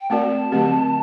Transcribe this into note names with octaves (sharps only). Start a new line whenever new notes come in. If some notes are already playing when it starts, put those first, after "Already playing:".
G5
A3 C4 F#4 A#4 D5 A5
D3 F#3 A3 C4 G4